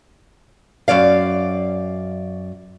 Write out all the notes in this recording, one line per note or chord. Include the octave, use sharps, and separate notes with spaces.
F#2 D#3 D5 F5